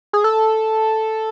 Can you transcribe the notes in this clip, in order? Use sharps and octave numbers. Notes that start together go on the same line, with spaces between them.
G#4
A4